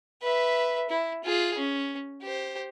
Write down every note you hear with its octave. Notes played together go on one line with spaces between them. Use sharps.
B4 E5
E4
F4 G#4
C#4
G4 C5